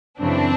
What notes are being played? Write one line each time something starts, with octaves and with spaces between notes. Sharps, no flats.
F#2 C#3 E3 C4 D4